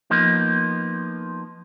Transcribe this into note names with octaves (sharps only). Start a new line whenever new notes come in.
F3 A#3 B3 D#4